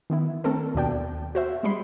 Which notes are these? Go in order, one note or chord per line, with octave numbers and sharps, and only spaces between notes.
D#3 B3 E4
A3 C4 D4 A4 A#4
D#2 B2 D4 G5
F#4 C5 E5
G3 G#3 B5 C6